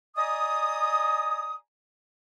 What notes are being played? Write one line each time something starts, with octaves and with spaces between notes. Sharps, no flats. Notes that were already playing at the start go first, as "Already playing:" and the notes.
D5 D#5 G#5 A#5 D#6